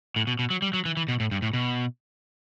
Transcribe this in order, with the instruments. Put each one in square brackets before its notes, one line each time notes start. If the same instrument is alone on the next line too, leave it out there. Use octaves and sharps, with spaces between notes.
[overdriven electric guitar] A2
B2
B2
F#3
G3
F#3
E3
E3
B2
A2
G2
A2
B2